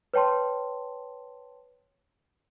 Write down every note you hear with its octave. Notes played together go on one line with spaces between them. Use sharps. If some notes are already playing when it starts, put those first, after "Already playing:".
B4 C#5 G5 A5 C6